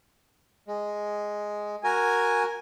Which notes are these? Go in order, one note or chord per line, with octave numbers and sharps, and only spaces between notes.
G#3
F#4 A#4 G#5